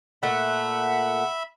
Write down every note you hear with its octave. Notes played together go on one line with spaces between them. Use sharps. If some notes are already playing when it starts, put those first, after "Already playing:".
A#2 A3 E5 F#5 B5